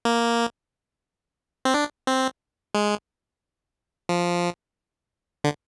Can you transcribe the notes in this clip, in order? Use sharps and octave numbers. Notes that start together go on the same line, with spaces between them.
A#3
C4
D4
C4
G#3
F3
D3